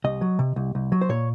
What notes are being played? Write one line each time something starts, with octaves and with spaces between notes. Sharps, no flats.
C2 D#5
F#3
C3
C2
C2
F#3
C5
A#2 C#5